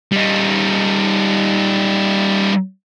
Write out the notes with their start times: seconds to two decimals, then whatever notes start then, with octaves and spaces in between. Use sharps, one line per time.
0.12 G3 D#4